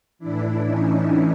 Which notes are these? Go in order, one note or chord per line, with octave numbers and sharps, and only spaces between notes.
A2 E3 D4 E4
C#4 D#4